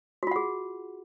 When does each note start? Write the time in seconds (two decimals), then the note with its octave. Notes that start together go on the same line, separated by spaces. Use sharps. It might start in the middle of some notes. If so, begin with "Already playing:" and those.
0.23 F#4
0.27 F4
0.31 F#5
0.36 G#4